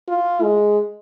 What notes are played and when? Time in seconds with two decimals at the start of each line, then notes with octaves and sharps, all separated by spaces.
0.08 F4
0.42 G#3